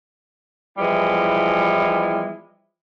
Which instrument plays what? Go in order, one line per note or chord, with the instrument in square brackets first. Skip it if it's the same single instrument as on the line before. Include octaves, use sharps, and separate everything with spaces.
[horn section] E3 F3 G3 G#3 B3 E4